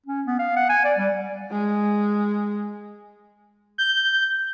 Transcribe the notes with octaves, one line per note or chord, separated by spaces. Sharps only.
C#4
B3
F5
F#5
G#5
D5
G3
G#3
G6